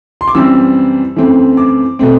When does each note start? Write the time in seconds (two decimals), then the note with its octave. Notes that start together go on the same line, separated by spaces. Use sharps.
0.21 C6
0.28 D6
0.34 F#2 E3 G3 C4 E6
1.16 F#2 E3 A3 C4
1.57 D6
1.99 B2 A3 C4